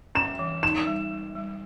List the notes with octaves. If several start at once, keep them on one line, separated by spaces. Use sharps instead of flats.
C#4 E7
E3
D#4 E7
G3
G3
G3